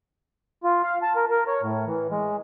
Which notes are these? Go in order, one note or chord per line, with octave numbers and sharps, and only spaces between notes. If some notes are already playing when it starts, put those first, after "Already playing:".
F4
F5
A5
A#4
A#4
C#5
A2
E3
G#3